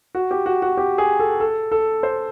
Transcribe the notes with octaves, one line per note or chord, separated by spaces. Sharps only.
F#4
G4
F#4
F#4
G4
G#4
A4
A4
A4
C5